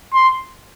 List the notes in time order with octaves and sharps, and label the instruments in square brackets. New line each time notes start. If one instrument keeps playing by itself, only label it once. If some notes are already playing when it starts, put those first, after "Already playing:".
[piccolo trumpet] C6